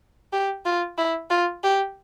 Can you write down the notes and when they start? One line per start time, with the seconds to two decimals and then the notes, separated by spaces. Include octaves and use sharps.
0.33 G4
0.65 F4
0.98 E4
1.30 F4
1.63 G4